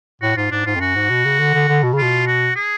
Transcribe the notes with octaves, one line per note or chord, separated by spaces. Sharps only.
A2 F#4
G#2 F4
G#2 D4
G#2 F4
F2
F#2 F#4
G#2
B2
C#3
D3
D3
D3
B2
C#3
B2 F4
F#4
G#4